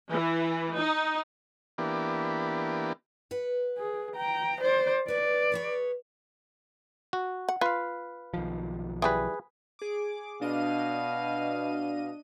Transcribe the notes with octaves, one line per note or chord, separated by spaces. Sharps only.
E3
D#4
E3 A#3 B3 D4 G4
B4 F#5
G#4
G5 A#5
C5 D5
B4 C#5 D5
G#4 B4 C#5
F#4
F#5
F4 B4 F5
B1 D#3 F3
E3 G3 G#4 B4
G#4 D6
B2 D4 D#5 F5 D#7